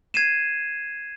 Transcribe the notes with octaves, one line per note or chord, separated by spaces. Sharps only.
G#6 C7 D#7 E7